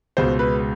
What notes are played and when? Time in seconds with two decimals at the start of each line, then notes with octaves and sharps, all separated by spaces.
0.17 C#2 B2 G#3 B3 C5
0.39 B4